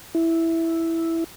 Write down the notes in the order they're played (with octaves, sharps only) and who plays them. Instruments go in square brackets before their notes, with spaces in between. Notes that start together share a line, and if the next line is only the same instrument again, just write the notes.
[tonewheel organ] E4